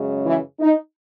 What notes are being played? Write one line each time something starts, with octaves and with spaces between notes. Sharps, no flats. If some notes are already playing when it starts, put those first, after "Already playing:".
Already playing: F#2 C#3 G#3
E3 E4
D#4